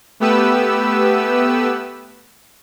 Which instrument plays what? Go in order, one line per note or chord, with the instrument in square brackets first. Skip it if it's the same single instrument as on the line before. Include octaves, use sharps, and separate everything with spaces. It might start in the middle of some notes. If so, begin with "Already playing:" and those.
[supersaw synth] A3 B3 G4 B4 E6